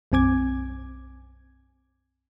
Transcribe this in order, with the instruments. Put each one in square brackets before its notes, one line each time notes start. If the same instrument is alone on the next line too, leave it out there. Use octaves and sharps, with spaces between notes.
[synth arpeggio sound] B1 F#2 C4 G#5 D6 G#6